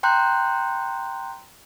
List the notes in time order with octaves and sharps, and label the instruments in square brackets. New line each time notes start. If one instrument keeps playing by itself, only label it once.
[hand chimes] G5 A#5 C6 F#6 G6